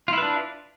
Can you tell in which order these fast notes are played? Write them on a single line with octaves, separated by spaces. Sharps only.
F4 E4 B4 D4